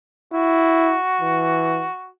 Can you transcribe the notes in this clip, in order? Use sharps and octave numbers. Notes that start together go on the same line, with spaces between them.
E4 F#4
E3